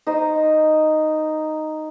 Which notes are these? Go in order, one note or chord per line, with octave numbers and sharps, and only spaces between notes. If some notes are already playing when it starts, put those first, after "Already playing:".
D#4 C5 D#5